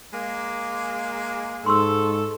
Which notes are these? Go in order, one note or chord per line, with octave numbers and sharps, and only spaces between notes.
G#3 A#3
G#2 A4 C6 C#6 E6